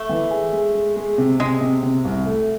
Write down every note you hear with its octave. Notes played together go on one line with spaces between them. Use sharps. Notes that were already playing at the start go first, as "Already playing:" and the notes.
Already playing: A3
E3
G#4
G#3
G#3
G#3
C3
C3 G#3
C3
C3
C2
A3